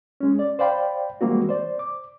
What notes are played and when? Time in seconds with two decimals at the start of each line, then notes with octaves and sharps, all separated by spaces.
0.20 G#3 C#4
0.39 D5
0.59 C5 D5 F5 G5 B5
1.21 E3 G3 G#3 A#3 C4 F#4
1.49 C5 D5
1.79 D6